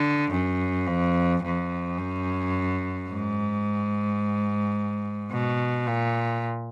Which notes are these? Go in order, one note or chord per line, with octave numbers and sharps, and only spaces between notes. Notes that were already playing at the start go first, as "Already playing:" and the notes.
Already playing: D3
F#2
F2
F2
F#2
G#2
B2
A#2